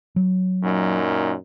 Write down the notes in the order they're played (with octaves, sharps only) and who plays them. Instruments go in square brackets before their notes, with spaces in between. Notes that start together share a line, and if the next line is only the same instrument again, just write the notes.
[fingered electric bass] F#3
[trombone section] F#2 A#2 D#4